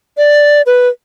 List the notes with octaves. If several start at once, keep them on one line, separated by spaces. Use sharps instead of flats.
D5
B4